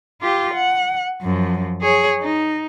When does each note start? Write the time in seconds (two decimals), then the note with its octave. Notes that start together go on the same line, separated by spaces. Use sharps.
0.21 F4 G4
0.54 F#5
1.22 F#2 F3
1.82 G#4 C#5
2.21 D#4